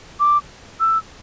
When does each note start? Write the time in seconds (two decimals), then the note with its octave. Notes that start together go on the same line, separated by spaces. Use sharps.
0.20 D6
0.80 E6